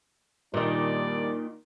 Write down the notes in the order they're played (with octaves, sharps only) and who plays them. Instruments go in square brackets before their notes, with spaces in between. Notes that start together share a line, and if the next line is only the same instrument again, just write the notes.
[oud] A#2 D#3 [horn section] G3 D4 D5